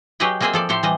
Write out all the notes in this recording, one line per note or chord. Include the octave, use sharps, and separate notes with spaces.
F#3 G4 G#4 B4 D#5 G5
A#3 C4 G#4 D#5 E5 G#5
F3 A4 D5
A2 G4 A4 C5
E3 G3 D#5